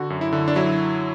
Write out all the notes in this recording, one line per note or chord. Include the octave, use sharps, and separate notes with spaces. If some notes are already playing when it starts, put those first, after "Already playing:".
Already playing: D3 F#4
F#2
E4
D3
D4
F#3 E4